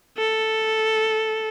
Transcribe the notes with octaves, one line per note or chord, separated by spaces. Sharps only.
A4